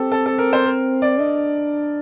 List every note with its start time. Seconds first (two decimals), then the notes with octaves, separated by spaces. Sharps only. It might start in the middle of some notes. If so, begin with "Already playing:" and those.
Already playing: C4 G4 A4
0.12 A4
0.26 A4
0.38 A#4
0.53 C5
0.66 A#4
1.02 D5
1.19 D4 D#5